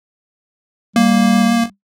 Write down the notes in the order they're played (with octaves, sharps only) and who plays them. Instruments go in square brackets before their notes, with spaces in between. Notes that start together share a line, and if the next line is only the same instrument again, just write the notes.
[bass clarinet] G3 [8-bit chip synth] A#3